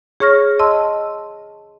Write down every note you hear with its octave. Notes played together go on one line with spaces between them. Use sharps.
G#4 C#5 C#6 F6 A#6
D#5 A5 C6 E6